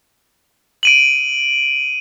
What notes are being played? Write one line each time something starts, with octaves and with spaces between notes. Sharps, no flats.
D7 D#7 F#7